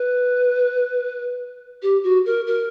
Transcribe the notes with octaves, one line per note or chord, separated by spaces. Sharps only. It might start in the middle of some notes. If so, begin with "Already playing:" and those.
Already playing: B4
G4
F#4
A#4
A#4